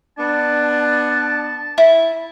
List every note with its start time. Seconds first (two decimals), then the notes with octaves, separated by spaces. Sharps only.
0.18 B3 D4 A5
1.78 E4